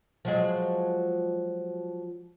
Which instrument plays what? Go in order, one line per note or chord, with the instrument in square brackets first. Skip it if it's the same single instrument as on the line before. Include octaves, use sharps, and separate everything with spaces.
[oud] F3 F#3 G#3